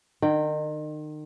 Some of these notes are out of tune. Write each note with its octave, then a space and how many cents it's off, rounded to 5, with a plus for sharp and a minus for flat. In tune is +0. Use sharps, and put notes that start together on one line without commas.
D#3 -35 G5 +0